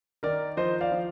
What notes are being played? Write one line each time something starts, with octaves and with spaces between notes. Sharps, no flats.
D#3 A#4 D5
F3 C5 D#5
D5 F5
F3